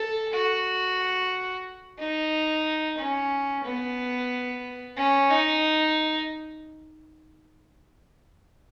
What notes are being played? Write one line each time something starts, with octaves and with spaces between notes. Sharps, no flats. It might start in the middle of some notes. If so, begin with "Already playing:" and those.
Already playing: A4
F#4
D#4
C#4
B3
C#4
D#4